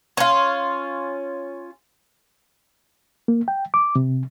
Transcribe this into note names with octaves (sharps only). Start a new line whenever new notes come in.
C#4 F4
A#3
G5
D6
C3